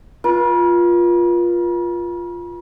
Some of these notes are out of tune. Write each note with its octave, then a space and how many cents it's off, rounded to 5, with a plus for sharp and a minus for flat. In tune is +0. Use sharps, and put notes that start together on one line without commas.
F4 +0 B4 -45